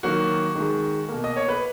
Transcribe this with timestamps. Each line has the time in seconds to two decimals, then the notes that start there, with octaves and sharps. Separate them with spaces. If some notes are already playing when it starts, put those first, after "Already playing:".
0.03 D#3 F#3 A#3 F#4
0.55 D#3 G#3
1.09 B2 A#3
1.24 D#5
1.36 C#5
1.48 B4